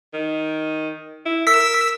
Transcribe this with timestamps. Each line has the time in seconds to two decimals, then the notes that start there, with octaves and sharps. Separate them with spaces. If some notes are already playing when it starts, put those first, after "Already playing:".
0.13 D#3
1.25 E4
1.47 A#4 E6 B6